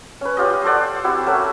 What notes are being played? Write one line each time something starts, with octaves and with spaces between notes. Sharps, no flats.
C#4 B4
C#4 F4 G4 D#5
A4 C5 D5 F#5
C4 E4 F#4 G4
A3 C#4 F#4 A#4